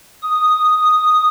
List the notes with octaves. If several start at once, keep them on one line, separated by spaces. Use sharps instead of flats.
D#6